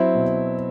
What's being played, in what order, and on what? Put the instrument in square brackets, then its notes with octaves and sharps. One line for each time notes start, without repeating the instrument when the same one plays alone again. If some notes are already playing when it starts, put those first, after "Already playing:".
Already playing: [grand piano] F#3 C4 E4
B2